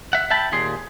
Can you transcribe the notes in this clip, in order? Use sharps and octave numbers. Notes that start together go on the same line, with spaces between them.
E5 F#5
E5 G5 A5 B5
D#2 A#2 G#4 C6